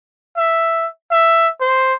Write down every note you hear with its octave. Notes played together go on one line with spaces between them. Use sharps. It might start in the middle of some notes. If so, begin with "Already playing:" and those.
E5
E5
C5